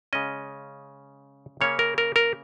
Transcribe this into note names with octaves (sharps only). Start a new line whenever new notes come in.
C#3 G#3 C#4 D#5
C#3 A#3 C#4 C#5
A#4
A#4
A#4